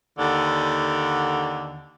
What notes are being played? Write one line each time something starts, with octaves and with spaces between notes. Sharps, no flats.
D#2 D3